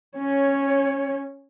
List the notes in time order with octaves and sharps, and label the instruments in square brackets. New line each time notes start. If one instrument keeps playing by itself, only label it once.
[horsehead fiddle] C#4 C#5